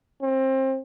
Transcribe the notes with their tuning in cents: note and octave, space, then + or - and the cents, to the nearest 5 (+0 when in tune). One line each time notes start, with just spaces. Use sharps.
C4 +25